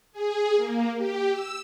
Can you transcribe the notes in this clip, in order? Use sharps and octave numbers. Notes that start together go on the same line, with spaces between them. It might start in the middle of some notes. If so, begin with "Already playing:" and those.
G#4
A#3
G4
E6